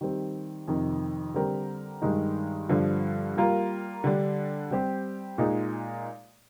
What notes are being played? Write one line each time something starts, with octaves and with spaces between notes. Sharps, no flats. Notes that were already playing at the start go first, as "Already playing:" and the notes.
D#3 G3 C4 G4
F2 C3 D#3
D3 G3 C4 G4 A#4
G2 D#3 G#3 D#4
G2 D3 F3
G3 A#3 F4 A#4
D3 G3 D4
G3 C4 G4
A#2 G#3 D#4 G#4